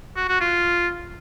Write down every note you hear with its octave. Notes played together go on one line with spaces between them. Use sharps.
F#4
F#4
F4